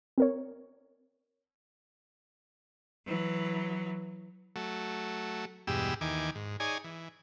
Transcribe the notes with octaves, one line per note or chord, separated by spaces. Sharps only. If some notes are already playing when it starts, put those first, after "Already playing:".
C4 A#4 C#5
E3 F#3
F#3 A3
E2 G2 B2 G#3 G4 E6
D#2 D#3 E3 G#5 D6
G#2
D#4 G#4 C#5 D5 G#5
E3